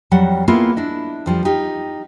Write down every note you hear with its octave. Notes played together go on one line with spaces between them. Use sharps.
F2 F#3 G3 F#5
A#3 B3 E4 F4 G#4 F5
D4 E4 D#5
F2 F3 G3
D#4 F4 G4